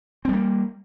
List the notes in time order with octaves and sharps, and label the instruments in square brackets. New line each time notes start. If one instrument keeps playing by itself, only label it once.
[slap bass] C4
G3
A#3